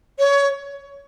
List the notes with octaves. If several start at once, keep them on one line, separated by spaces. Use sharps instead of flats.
C#5